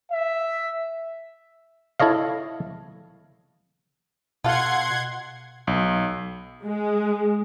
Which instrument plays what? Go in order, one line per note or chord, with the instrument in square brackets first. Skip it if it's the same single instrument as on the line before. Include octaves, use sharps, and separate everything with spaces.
[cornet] E5
[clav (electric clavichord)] E4 A4 C#5 D#5 F5
[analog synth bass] B2 [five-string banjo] F4 A4 F5 [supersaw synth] F#5 C6 G#6
[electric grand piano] B1
[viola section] G#3